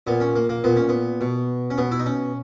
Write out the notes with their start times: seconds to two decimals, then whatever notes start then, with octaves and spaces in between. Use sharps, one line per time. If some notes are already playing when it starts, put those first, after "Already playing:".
0.07 A#2 B3
0.20 C#4
0.36 A#3
0.49 A#3
0.64 A#2 B3
0.76 C#4
0.89 B3
1.21 B2
1.70 C#4
1.78 B2 B3
1.91 E4
1.99 D#4
2.06 C#4